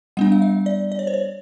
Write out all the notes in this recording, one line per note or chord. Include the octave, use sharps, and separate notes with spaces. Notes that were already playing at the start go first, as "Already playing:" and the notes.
G3 B3 D4 F#5
F5
E5
D5
D5
C#5
C5
C#5